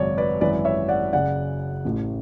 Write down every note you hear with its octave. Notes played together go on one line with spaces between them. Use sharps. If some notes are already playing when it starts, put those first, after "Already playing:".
Already playing: G#1 F#2 C#3 C#5 D5
B4 D5
G#1 F#2 E3 B4 D5
C#5 E5
D5 F#5
F#1 F#2 C#3 D5 F#5
A1 A2 E3